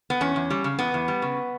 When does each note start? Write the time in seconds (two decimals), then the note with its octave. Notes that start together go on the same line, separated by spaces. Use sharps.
0.10 B3
0.21 E2 C#4
0.36 E2
0.50 G3
0.64 C#3
0.79 E2 B3
0.94 E2
1.08 G3
1.22 C#3